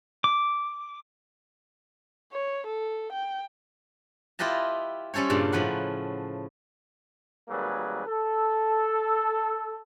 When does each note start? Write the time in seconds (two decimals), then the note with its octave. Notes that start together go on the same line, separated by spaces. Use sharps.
0.24 D6
2.32 C#5
2.67 A4
3.12 G5
4.39 E4 F4 G4 B4 D#5 A5
5.14 G3 C#4 A4 C5 C#5
5.30 G2 A#2 C#3
5.52 A2 F3 B4 F#5
7.49 G#1 F#3 G3 A#3 G#4 B4
8.07 A4